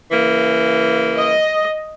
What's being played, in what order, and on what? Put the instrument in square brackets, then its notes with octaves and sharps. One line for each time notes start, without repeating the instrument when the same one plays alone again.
[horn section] C#3 E3 A#3
[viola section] D#5